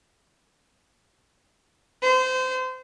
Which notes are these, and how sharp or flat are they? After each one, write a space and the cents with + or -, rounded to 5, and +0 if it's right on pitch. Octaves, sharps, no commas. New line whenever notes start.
C5 -25